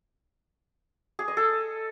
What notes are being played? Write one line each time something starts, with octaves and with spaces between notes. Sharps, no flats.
G#4
D#5
A4